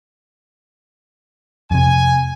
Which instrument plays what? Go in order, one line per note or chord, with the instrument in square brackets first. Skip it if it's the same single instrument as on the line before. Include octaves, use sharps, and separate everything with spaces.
[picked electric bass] F2 C3 [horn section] G#5